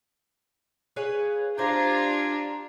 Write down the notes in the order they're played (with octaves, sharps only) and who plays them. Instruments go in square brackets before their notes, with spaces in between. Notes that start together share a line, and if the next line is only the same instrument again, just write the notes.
[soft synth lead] G#4 [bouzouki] B4 C#5 F5
[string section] D4 F4 [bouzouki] G4 C5 [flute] A#5 [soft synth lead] G#6